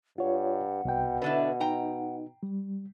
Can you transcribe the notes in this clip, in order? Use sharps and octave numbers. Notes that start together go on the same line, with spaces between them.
G2 F4 C#5 F#5
C2 B2 G5
D3 D4 E4 B4
D#4 G5 A#5
G3